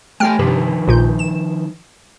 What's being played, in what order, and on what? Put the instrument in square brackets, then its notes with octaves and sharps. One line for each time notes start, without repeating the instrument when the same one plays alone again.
[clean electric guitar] A3 G4 G#5 [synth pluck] G5 F6
[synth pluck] G2 C3 [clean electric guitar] D#3 F3 B4
[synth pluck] A#1 A#2 G6
E7